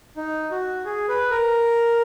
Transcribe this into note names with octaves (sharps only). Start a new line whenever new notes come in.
D#4
F#4
G#4
B4
A#4